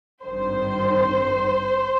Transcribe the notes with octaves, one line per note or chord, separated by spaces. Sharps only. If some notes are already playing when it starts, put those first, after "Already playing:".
G#1 G2 D#3 C5